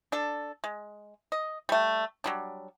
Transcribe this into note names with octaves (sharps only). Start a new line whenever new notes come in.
D4 A4
G#3
D#5
G3 A3
F#3 G3 D4